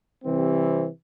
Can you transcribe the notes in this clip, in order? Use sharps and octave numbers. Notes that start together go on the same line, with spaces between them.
C3 E3 G3 C4